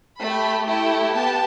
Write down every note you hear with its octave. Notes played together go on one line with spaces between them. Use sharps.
A3 G4 B5
A3 E4 G4
B3 G4 A5